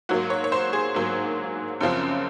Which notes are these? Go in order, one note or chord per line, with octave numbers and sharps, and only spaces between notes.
G#2 F#3 A#3 F#4
C#5
C#5
C5
G#4
G#2 F#3 A#3
F#2 C#3 F3 C4